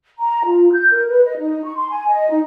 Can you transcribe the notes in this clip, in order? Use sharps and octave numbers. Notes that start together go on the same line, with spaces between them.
A#5
F4
G6
A#4
B4
D#5
D#4
C#6
C6
G#5
D#5
D#4